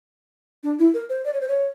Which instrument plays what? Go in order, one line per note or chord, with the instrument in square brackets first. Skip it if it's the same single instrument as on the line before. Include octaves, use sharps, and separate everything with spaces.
[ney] D4
E4
A#4
C5
D5
C#5
C5
C#5